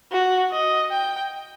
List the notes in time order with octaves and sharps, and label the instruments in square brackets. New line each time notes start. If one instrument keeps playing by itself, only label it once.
[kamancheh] F#4
D#5
G5